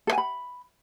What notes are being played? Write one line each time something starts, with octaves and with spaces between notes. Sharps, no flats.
A4
G#5
B5